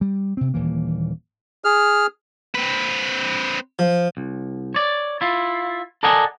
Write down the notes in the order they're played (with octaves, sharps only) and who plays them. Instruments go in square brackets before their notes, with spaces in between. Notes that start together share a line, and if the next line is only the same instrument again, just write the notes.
[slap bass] G3
C3 C4
D#1 E3 A#3
[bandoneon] G#4 F6
[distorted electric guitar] C4 B4
[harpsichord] F3
[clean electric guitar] C2
C#5 D5
E4 F4
A4 A#4 D5 D#5 F#5 G#5